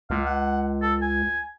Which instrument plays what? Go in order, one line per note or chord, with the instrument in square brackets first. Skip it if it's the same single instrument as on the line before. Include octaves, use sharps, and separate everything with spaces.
[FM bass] C#2 [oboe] F5
[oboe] F#5
A4
G#5